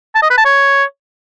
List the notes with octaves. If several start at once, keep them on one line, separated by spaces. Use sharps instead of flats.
A5
D#5
B4
A5
C#5